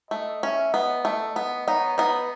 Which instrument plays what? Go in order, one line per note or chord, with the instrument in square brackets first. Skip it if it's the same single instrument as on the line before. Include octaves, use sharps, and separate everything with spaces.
[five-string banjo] A3 [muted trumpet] D#5
[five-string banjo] C#4 [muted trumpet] E5
[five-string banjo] B3 [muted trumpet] D#5
[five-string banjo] A3 [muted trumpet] D#5
[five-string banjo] B3 [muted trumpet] D#5
[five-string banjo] B3 D#4 [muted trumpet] C#5
[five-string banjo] B3 D#4 [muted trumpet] B4